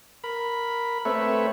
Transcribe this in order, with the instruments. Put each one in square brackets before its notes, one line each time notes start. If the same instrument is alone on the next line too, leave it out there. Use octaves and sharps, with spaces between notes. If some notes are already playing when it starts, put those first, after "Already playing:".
[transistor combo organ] A#4 B5
A3 C4 A4 B4 C#5 E5